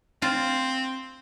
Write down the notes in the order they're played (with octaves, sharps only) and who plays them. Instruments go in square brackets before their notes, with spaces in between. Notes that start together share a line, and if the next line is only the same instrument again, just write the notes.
[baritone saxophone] C4 [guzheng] F4 A5